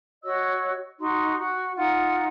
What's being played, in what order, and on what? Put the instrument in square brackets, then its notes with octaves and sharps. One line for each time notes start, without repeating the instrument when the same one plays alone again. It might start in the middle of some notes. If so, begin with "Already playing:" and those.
[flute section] F#4 C#5 D#5 E6
D#4 F#4 C6
F#4
D#4 F4 F#5